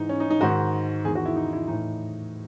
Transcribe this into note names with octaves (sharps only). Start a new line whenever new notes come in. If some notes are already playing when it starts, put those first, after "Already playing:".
Already playing: G#2 E3 D#4
C#4
D#4
D#4
G#2 D#3 F#4
E2 D#3 G#4
F#4
E4
D#4
E4
A2 E3 D#4